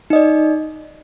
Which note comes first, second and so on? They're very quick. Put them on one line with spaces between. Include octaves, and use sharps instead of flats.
D#4 D#5 D5